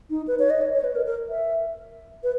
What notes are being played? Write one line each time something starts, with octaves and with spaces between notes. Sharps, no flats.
D#4
B4
C#5
D#5
C#5
C#5
B4
A#4
A#4
E5
B4